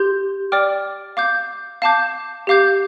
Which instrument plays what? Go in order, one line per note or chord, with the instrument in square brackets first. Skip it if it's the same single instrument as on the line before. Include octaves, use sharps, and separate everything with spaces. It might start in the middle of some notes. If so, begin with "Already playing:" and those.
Already playing: [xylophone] G4 C6 G6
D5 G5 D6 F6
F5 D6 G6
F5 A5 D6 G6
G4 F5 D6 G6